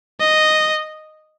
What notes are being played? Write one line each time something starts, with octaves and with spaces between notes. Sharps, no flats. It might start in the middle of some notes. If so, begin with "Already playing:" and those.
D#5